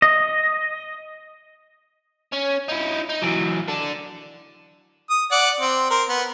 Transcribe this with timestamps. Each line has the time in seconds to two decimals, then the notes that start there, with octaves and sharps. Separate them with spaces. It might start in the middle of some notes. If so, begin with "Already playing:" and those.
0.02 D#5
2.33 C#4
2.69 D#4 E4
3.09 D#4
3.22 E3 F#3
3.68 D4 A4
5.10 D#6
5.32 D5 F#5
5.60 C4
5.90 A#4 C5
6.09 B3